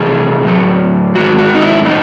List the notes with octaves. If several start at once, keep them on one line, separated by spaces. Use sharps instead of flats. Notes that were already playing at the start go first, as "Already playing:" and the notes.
Already playing: C3 E3 A3 G#4
A2 F#3 A3
G#2 D#3 G#3 F#4
F#4
D#4
E4
A2 F#3 A3 D#4